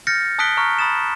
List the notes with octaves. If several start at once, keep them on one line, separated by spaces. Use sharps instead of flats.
F6 G6 A6 A#6 C#7
A5 D#6 F#6 B6 D7 G7
A#5 C#6 F6
B5 D#6 A6 E7